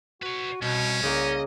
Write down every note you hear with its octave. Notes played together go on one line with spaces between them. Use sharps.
F#4 B4 C#5
C2 B2 C#4
C2 C#3 A#3 D#5